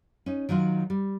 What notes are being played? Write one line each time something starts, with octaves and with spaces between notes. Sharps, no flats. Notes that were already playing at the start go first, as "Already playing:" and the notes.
C#4 D#4
D#3 F#3 D#4 F4
G3